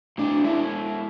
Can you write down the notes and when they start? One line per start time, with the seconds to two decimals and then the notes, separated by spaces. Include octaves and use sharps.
0.18 A2 D4
0.44 G#3 E4